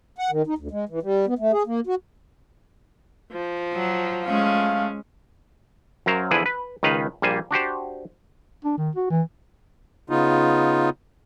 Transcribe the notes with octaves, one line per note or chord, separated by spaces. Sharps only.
F#5
D#3
D#4
D2
G#3
E3
G3
B3
A3
G#4
A#3
F#4
F3
F#3
G#3 A3 C#4 F5
F#2 F#3 A#4 C5 F5 A#5
E2 D3 F3 E4 G#4 B4
B4
C#2 D#3 D#4 B4 F5
A#1 G3 A#3 C5 G#5
D4 F#4 G4 C5
D4
D#3
F#4
E3
C#3 B3 D#4 F4